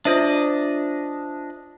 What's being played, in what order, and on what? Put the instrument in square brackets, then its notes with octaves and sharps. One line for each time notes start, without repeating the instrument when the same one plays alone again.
[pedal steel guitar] D4 D#5 [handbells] F4 C5 E5